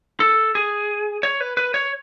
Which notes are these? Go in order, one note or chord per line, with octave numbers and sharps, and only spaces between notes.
A4
G#4
C#5
B4
B4
C#5